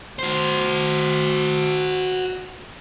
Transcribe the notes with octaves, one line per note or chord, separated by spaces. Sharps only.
F#4 C5